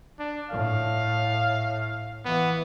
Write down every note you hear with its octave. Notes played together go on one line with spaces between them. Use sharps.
D4
A2 F5
E3 B3